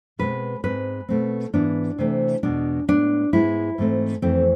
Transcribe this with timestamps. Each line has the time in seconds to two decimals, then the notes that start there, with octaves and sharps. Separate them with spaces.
0.19 B2 G#3 C4 B4
0.63 G#2 G#3 C4 B4
1.09 B2 A3 C4
1.53 G#2 E3 B3 D4
1.99 C3 E3 A3 C4
2.43 E2 B2 G#3 D4
2.88 A2 G#3 B3 D4
3.33 G#2 G#3 B3 E4
3.78 G#2 E3 A3 C4
4.22 F2 E3 A3 C4